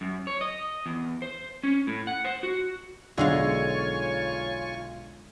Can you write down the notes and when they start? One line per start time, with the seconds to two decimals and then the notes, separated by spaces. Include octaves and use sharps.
0.01 F#2
0.27 C#5
0.41 D#5
0.86 E2
1.22 C5
1.63 C#4
1.87 A2
2.07 F#5
2.25 C5
2.43 F#4
3.18 B1 D3 G#3 F4 C#5 F5 G#5 C#6